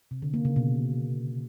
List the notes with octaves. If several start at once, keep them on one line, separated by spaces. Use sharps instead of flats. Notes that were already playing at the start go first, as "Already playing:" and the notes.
C3
D3
A#3
C#3
B2